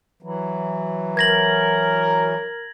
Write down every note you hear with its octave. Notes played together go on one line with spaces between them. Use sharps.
E3 F#3
A#4 G#6 A#6 F#7